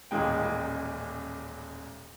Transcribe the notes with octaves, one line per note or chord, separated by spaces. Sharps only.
D#1 A1 A#2 G#3 G5